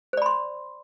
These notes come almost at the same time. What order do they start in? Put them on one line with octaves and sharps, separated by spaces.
C5 D5 B5 C6